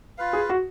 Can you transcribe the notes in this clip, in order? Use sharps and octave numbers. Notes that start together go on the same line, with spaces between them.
F4 B4 F5
G#4
F#4